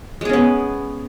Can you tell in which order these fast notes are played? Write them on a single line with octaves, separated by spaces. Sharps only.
G#3 G#4 C#4 B3